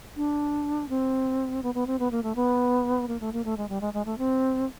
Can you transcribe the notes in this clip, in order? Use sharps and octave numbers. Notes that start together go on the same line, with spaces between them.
D4
C4
B3
B3
C4
B3
A#3
A3
B3
A#3
A3
A#3
A3
G#3
G3
G#3
G#3
A3
C4